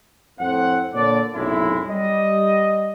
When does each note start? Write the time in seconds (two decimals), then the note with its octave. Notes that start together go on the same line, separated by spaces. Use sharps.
0.39 F2 A2 C4 C5 F#5
0.94 A#2 D3 A4 C#5 D5
1.34 B1 F#2 A2 C3 G#3 E4
1.87 G3 D#5